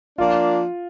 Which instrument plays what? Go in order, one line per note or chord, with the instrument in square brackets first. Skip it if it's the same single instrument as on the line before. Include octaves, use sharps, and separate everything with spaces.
[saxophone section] F3 A#3 D4 [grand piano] F4